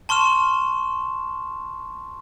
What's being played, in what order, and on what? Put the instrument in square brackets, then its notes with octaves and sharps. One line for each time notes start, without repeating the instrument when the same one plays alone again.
[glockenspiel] A5 C6 C#6 F6 E7